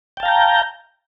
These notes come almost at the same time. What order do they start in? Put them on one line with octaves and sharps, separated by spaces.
G5 A5 F5 A#5 G6